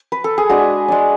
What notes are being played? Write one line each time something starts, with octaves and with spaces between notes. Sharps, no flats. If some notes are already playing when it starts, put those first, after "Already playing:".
Already playing: C#5
B4
A4
G#4
G#3 D4 F#4
G#3 D4